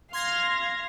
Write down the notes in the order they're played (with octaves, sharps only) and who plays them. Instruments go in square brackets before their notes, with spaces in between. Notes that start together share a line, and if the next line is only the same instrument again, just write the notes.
[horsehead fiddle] F5 [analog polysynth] C6 G#6 A#6